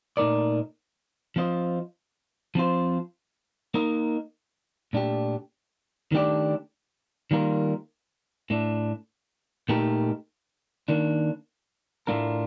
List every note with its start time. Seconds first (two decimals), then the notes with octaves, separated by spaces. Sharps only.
0.17 A#2 A3 D#4 A#4 D5
1.36 F3 C4 F4 C5 D#5
2.55 F3 C4 F4 C5
3.74 A#3 D#4 A#4 D#5
4.93 A#2 A3 D4 G4
6.12 D#3 A3 D4 G4 D5
7.31 D#3 G3 A#3 F4 A#4
8.50 A2 A3 D4
9.69 A#2 A3 D#4 G4 A#4
10.88 D#3 A#3 D4
12.07 A2 A3 D4 F4 A#4